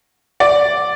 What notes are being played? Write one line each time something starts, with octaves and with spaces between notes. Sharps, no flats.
D5